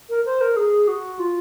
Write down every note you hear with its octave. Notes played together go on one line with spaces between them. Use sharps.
A#4
C5
A#4
G#4
F#4
F4